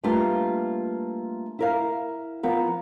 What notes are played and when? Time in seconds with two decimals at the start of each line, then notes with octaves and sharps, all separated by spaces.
0.03 G3 A3 A#3 D4 F4 B4
1.59 E4 A#4 F5
2.43 F3 B3 A#4